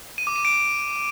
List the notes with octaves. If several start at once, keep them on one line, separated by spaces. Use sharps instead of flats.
D#7
D6
D#7
D7